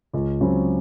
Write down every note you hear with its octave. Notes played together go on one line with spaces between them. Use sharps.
C#2
C#3 F#3 C4